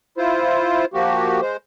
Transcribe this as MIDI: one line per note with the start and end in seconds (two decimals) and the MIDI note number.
0.18 0.85 64
0.18 0.85 65
0.18 0.85 72
0.94 1.41 53
0.94 1.41 58
0.94 1.41 66
0.94 1.41 67
1.41 1.57 56
1.41 1.57 72